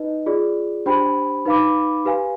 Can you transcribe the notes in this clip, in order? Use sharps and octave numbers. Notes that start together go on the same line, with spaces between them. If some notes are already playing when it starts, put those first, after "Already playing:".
Already playing: D#4 B4 D#5
F4 G#4 D5
D4 G4 C5 G5 B5
D#4 B4 F5 B5 D6
G4 B4 F5 G#5